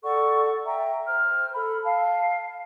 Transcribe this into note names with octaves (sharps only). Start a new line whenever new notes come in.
A4 D5 F#5 C#6
E5 G5 A#5
C5 F6
A4 B5
F5 A5